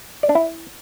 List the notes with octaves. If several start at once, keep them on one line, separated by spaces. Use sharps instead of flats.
D5
D4
E4